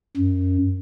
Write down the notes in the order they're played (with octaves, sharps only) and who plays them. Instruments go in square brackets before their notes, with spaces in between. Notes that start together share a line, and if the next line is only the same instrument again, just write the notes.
[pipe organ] F#2